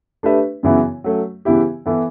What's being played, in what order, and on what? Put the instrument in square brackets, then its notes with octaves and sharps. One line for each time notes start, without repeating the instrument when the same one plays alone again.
[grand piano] A3 D4 G4 B4 E5
F#2 C#3 E3 B3 E4
F#3 A3 C#4
C#3 E3 B3 E4 G4
E3 B3 E4 A4